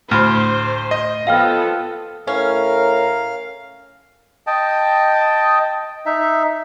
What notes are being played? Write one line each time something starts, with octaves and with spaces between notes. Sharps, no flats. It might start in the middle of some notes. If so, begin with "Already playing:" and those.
D2 A2 C5 B5 F6
D#5
F3 B3 A4 F5 G5 F6
A2 C#4 A#4 F5
D#5 G5 A5
D#4 E5